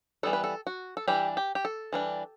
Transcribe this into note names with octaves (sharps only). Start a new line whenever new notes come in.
E3 G3 B3 A4
B4
A4
F#4
A4
E3 G3 D4 G4
G4
G4
A4
E3 G3 D4